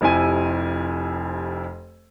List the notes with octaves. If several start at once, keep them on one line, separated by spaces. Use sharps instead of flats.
F1 F2 E4 G4 G#5 D#7